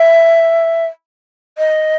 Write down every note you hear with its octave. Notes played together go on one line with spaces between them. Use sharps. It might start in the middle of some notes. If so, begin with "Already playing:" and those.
Already playing: E5
D#5